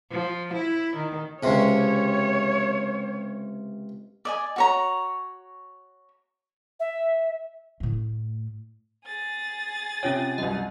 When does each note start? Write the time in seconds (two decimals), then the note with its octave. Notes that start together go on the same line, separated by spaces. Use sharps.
0.11 F3
0.54 E4
0.96 D#3
1.43 C#2 C3 C#5
4.25 D5 D#5 G#5
4.56 F#4 C#5 A#5
6.80 E5
7.80 A2 A3
9.06 G#4 A6
10.03 C3 C#4 F4 C#5 G5
10.38 C2 F#2 D#5